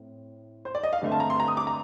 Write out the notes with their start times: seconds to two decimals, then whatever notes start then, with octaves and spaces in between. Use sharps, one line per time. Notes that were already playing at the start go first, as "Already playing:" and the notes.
Already playing: A2 C4
0.65 C5
0.75 D5
0.83 D#5
0.93 F5
1.02 G2 D3 A3 C4
1.12 A5
1.20 A#5
1.30 C6
1.40 A#5
1.48 D#6
1.57 D6
1.67 A#5